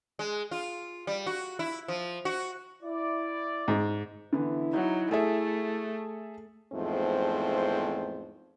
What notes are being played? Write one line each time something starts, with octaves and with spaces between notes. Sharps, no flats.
G#3
F4
G3
F#4
E4
F3
F#4
E4 D5
G#2
D3 E3 B3 E4
F#3 D#4
A3 G#4 A4 E5
E2 G#2 F3 A3 C4